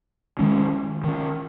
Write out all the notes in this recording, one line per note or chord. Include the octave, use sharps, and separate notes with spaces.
D#3 G#3 C#4
D#3 C#4